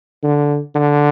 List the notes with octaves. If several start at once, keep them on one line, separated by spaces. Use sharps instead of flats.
D3
D3